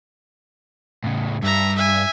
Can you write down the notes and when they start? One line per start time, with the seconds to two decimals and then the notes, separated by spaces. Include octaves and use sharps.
1.04 A2 C#3
1.43 G2 E5 A#5
1.76 E5 G#5